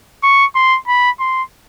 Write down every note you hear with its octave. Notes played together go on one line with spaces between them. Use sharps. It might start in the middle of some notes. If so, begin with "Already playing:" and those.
C#6
C6
B5
C6